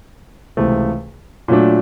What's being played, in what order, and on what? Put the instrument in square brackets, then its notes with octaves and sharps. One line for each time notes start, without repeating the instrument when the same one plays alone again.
[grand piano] C#2 C3 E3 A3
A#2 F#3 A3 D4